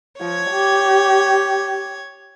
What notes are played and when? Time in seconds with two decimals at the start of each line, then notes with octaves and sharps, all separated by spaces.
0.20 F3 C#5 G#6
0.51 G4